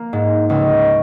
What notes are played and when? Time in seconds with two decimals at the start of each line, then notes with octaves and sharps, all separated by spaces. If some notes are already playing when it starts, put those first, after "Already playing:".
Already playing: A#3
0.13 G#2
0.50 C#2